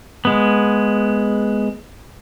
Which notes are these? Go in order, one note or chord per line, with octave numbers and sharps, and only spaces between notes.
G#3 B3